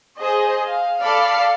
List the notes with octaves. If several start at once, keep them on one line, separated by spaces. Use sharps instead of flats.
G#4 C5 D#5
F5
A4 D5 F5 B5 F6 C7